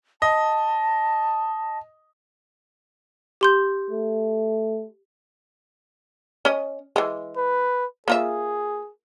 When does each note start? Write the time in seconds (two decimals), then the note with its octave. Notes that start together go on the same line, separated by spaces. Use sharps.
0.22 D#5 A5
3.41 G4 C6 G6
3.91 A3
6.45 C#4 D#5
6.96 E3 G#3
7.37 B4
8.08 A#3 F4 G#4 E5